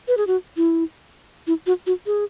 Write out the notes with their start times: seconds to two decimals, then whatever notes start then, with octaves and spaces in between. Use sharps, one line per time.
0.08 B4
0.17 G#4
0.27 F#4
0.57 E4
1.47 E4
1.67 F#4
1.87 F#4
2.06 G#4